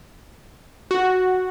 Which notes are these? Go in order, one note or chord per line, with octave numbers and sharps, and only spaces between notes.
F#4